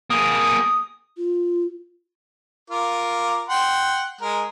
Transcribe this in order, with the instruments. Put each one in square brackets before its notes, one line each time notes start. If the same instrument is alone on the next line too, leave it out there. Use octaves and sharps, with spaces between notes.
[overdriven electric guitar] A#3 G#4 [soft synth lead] D#6
[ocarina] F4
[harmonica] F4 A#4 D6
F#5 G5 C6
G#3 A#4